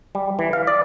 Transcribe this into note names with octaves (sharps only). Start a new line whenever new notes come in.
G3
E3
F5
D5